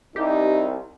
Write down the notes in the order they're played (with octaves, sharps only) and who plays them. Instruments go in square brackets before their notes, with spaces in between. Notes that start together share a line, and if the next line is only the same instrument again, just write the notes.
[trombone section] C2 [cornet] D#4 [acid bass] G4